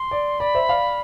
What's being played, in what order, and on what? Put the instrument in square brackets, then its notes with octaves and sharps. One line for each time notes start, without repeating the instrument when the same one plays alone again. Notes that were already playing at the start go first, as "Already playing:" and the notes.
Already playing: [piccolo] C6
[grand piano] D5
[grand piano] D5 [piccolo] B5
[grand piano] C5 E5
D5 F5